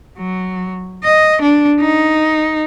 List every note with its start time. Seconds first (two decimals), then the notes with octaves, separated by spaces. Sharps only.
0.18 F#3
1.04 D#5
1.42 D4
1.81 D#4